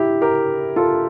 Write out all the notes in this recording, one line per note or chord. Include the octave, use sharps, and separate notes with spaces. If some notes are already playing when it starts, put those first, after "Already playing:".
Already playing: E4 G4
G4 A#4
F4 A4